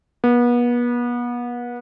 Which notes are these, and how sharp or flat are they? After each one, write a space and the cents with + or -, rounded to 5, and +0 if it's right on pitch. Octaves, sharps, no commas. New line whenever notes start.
B3 -35